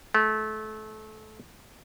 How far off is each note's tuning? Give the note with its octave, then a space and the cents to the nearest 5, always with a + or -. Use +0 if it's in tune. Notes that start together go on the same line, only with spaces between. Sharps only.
A3 -25